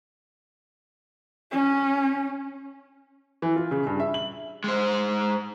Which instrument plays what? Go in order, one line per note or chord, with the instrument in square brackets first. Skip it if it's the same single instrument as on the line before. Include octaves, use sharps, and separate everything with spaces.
[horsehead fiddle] C#4
[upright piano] E3
F4
C#3
G2
E5
F#7
[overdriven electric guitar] G#3 C5